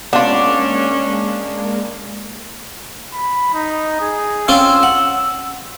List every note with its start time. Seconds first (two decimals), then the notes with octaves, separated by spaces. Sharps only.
0.13 G#3 A#3 B3 C#4 D4 F4
3.14 B5
3.54 D#4
4.01 G#4
4.48 C4 C#4 F4 E6
4.83 F#5